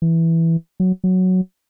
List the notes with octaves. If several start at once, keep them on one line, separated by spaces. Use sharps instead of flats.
E3
F#3
F#3